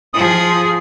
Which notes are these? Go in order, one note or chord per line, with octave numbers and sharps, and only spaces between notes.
F3 G#4 D#6